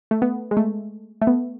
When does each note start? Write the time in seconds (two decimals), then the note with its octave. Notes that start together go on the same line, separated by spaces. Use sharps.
0.11 A3
0.22 B3
0.51 G#3
0.57 A3
1.22 A3
1.27 B3